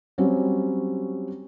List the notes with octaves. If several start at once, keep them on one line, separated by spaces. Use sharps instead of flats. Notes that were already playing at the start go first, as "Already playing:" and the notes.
F#3 G3 C4 C#4